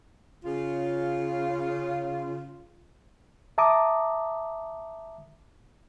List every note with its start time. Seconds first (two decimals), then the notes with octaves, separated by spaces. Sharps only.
0.45 C#3 F4
3.58 E5 A5 A#5 D6 D#6